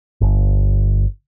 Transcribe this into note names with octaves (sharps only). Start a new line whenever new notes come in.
G1